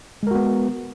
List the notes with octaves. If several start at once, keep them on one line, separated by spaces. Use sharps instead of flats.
G#3 B3 F#4 A#4